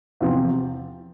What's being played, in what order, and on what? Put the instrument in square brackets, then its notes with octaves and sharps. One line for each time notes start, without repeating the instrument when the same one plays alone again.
[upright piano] E2 C3 F3 C4